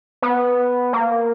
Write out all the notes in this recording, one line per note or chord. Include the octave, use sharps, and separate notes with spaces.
B3
A#3